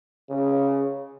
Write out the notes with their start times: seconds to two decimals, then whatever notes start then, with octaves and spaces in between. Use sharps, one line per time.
0.30 C#3